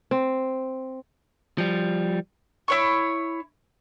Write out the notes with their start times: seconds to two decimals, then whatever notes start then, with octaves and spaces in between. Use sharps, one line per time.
0.11 C4
1.58 F3 G3
2.68 E4 C#5 C#6